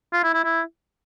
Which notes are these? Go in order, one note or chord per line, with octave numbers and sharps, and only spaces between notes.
F4
E4
E4
E4